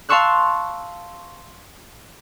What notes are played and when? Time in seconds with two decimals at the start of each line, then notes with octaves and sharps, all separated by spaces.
0.09 F5 A5 C6 C#6 E6 F#6